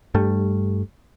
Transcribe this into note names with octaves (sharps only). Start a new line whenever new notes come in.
G2 G3 A3